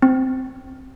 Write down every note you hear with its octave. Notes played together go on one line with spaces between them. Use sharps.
C4